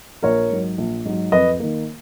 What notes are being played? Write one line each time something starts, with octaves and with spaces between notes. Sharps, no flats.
A#1 A#4 C#5
G#2 F#3
A#1
G#2 F#3
F2 B4 D#5
D#3 A#3